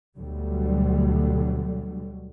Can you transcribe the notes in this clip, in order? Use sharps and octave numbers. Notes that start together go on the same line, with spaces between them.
D2 B2 D3 F#3 G3